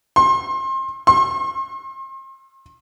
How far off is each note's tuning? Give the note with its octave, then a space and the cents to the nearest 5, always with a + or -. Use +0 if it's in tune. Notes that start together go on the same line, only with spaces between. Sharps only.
C6 +30
C6 +40